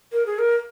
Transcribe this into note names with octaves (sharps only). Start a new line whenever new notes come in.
A#4
G#4
A#4